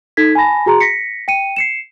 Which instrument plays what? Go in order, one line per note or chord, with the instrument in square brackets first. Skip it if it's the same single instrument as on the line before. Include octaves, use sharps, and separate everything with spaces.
[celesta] D#4 A4 G#6 B6
G#5 A5 B5 A#6
F#4 G#4 A#5 C6
A#6 B6 C#7
G5 C#7 D#7
C7 C#7 E7